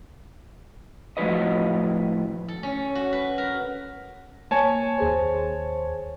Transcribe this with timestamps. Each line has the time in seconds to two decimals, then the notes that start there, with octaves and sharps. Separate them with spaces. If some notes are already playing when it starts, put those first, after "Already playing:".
1.17 A2 F3 F#4 B4 D#5
2.48 A4
2.63 C#4
2.95 F#4
3.13 B4
3.38 A#4
4.51 A#3 C#5 G#5 A5
4.98 D#2 G#4 C5